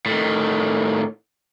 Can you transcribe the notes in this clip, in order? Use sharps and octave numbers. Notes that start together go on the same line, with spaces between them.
A2 D#3